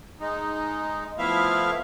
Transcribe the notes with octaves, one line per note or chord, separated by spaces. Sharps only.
G#3 D#4
F3 A3 B3 E4 E5 F5